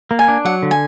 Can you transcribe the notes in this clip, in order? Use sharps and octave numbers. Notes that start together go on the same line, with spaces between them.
A#3
G#5
D4
F#3 F#5
D3
G#5